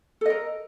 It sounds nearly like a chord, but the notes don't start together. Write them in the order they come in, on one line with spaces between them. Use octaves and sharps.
A4 D#5 A#4